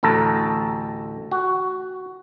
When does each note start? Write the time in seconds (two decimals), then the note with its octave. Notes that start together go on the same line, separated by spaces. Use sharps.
0.03 A1 D2 A4 A#5
1.31 F#4